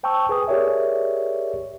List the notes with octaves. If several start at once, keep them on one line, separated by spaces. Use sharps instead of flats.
C5 G5 A5 C#6 E6
G#4 B4 G#5 D#6
G4 G#4 A#4 C#5 D5 E5